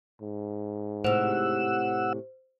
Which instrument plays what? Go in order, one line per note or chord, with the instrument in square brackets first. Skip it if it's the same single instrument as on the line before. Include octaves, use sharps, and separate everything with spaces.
[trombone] G#2
[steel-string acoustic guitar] A2 C3 [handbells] C5 [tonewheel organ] F#5 E6